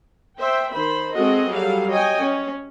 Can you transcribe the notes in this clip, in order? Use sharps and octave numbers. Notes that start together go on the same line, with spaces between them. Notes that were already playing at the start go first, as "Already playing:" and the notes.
C5 E5 G5
D#3 C5 B5
G#3 C4 F#4 G#4 A4 D#5
F#3 G3 A4 F5
C#5 D#5 G5 G#5
C#4